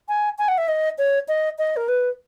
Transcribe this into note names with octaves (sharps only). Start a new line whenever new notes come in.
G#5
G#5
F#5
E5
D#5
C#5
D#5
D#5
A#4
B4